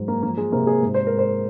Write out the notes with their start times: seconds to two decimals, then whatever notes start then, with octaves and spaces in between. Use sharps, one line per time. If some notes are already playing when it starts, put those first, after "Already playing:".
Already playing: G#2 F#3
0.08 A#3
0.23 F3 A#3
0.38 G#3
0.52 C3 A#3
0.67 G#4
0.82 G#2
0.94 C5
1.07 A#4
1.12 G#2
1.18 C5